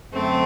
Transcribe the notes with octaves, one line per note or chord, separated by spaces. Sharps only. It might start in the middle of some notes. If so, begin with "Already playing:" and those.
F#2 D3 A3 C4